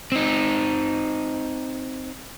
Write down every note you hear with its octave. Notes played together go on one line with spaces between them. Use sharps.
C4 D#4